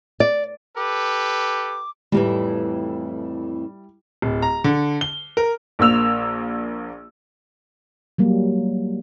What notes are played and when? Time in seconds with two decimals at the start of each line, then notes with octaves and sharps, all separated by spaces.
0.20 D5
0.77 G4 A4 B4 D6
2.12 F2 A2 E3 G3 E4
4.22 D1
4.42 A#5
4.64 D3
5.01 G7
5.37 A#4
5.79 A#1 A#3 E6 F7
8.18 F#3 G3 A#3